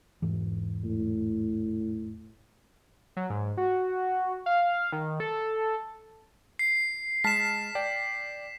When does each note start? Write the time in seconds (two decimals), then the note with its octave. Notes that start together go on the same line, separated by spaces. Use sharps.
0.22 E1 G#2 E3
0.84 A2
3.16 F#3
3.30 G#2
3.57 F#4
4.46 F5
4.92 D#3
5.20 A4
6.59 C7
7.24 G#3 A5 F6 B6 E7
7.75 D5 G5